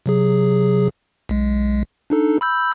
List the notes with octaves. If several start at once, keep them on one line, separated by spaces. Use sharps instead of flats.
C3 F#3 G#4
B1 G#3
D4 D#4 A4
B5 E6 G6